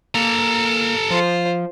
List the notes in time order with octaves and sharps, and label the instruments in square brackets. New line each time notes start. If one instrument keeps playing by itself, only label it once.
[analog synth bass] A#3 [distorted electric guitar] A4 A#5
[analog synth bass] F3 [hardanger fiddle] F4 C5